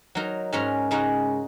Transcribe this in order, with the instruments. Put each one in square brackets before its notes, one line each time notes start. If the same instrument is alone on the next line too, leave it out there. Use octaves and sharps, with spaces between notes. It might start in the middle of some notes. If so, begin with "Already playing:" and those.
[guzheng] F#3 D#4 A#4
G#2 G#3 C#4 A#4
C#3 G#3 D#4 F#4 A#4